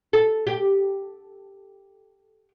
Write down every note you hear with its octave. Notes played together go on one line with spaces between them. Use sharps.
A4
G4